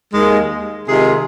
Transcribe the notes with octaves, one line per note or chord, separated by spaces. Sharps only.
D#2 D#3 G#3
C3 D#3 G#3 F4 G#4